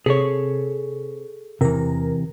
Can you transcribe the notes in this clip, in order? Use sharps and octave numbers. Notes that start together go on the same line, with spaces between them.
C3 G#4 A4 C#5
E2 C3 E3 A#4